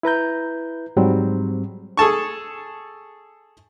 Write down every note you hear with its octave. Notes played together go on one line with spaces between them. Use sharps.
E4 B4 A#5 G6
G#2 F#3 G3 C4
G#4 A4 A5 C#6